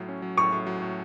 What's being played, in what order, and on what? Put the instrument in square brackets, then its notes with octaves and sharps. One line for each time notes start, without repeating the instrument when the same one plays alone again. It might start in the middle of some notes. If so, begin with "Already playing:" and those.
Already playing: [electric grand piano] A2 F#3
C#4
F#3
[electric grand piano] A2 [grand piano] C#6
[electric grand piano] A2
F#3
A2